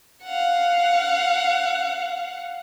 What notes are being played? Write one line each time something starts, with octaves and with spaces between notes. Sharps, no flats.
F5 F#5